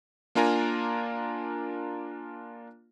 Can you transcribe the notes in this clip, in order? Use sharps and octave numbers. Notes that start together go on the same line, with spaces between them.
A#3 D4 F4 A#4 G#5 A#5